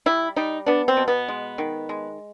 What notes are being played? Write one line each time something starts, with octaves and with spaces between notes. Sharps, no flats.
G3 E4
G3 D#4
B3 D4
C4
B2
B3
G#3
D#3
G#3